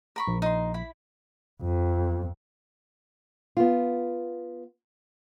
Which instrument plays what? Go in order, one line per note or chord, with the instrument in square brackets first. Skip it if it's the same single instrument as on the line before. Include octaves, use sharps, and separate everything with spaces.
[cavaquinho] A#4 B5 C#6
[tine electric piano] A#1
[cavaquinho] D#4 C6
E4 B5
[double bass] F2
[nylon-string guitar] B3 F4